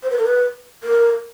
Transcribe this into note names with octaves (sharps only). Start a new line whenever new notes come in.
C5
B4
A#4
B4
A#4